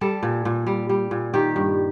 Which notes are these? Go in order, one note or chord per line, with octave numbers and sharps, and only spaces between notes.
G3 A4
A#2
A#2
G3
G3
A#2
D#3 G4
G2